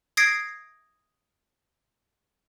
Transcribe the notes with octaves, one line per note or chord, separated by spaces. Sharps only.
D#6 G#6 A#6 C7 D7